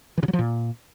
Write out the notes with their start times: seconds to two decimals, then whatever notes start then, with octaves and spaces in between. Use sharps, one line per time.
0.18 E3
0.23 C#3
0.28 F#3
0.33 F3
0.39 A#2